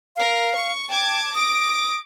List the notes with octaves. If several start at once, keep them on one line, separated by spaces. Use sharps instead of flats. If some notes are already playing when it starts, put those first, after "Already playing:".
A#4 F5
C#6
G5 A5 D6 G#6
D6 D#6 A#6 D7